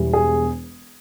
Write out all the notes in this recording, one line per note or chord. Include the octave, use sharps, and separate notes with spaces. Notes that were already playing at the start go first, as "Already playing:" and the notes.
Already playing: E1 E2 E3 G3
G#4